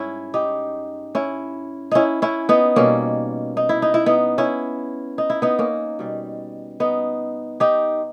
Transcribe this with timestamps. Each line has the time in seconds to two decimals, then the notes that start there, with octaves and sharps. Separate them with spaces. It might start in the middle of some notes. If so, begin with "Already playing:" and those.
Already playing: G#2 G3 C#4 E4
0.34 D#4 G4
1.15 C#4 E4
1.91 C#4 D#4 E4
2.22 C#4 E4
2.49 B3 D#4
2.76 B2 G3 A#3 C#4
3.57 D#4
3.69 E4
3.82 D#4
3.94 E4
4.06 B3 D#4
4.38 C#4 E4
5.18 D#4
5.30 E4
5.42 B3 D#4
5.59 A#3 C#4
5.99 B2 G3
6.80 B3 D#4
7.60 D#4 G4